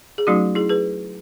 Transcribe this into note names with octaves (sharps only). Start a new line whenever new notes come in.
G#4
F#3 A3 C#4 D#4 F#4
E4 G#4
G#4 B4